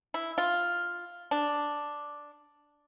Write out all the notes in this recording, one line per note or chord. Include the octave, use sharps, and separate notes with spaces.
E4
F4
D4